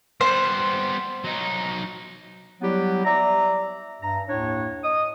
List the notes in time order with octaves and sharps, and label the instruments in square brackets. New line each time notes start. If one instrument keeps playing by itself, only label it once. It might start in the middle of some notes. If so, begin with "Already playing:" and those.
[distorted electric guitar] G3 B3 [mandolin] C5
[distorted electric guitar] F#3 D#4
[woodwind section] F#3 G3 B3 E4 G4
D5 E5 A#5
G2 A#5
D#2 A2 D4 C#5
D#5 D#6